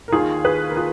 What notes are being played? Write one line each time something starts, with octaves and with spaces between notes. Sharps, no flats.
A#4
D#2 D#3 F4 G#4
G#4 B4
A#4
F4 G#4